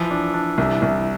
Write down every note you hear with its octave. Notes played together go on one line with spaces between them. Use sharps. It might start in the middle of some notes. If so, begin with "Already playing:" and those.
Already playing: E3 F3
D4
D4
C2
C2